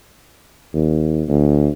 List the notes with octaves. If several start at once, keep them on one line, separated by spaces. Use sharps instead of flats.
D#2
D2